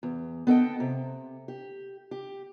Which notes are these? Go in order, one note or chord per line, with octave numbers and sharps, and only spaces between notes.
E2
B3 A4 D#5 G5
C3
G4
G4